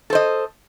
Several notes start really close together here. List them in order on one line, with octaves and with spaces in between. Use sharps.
A4 C5 D#5